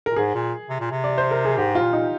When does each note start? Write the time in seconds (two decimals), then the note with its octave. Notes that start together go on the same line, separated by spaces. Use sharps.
0.06 A#2 A#4
0.16 G#2 G#4
0.34 A#2
0.69 C3
0.80 A#2
0.91 C3
1.04 D5
1.18 C5
1.31 A#4
1.45 G#4
1.57 G#2 G4
1.75 F4
1.82 A#2
1.93 D#4